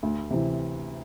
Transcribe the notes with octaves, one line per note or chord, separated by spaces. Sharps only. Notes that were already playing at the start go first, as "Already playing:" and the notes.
D2
C3 E3